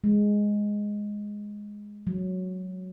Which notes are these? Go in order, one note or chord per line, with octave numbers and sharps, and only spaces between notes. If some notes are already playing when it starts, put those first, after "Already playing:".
G#3
F#3